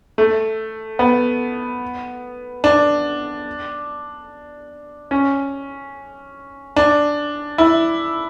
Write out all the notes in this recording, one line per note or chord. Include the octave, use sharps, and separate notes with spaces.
A3
B3
D4
C#4
D4
E4